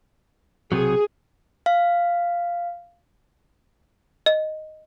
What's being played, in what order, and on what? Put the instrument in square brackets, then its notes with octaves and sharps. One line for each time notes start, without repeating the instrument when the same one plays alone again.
[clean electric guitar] B1 C3 F#3 [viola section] G#4
[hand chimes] F5
[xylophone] D#5